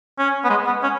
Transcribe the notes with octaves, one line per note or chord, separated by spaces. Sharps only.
C#4
B3
G#3
B3
C#4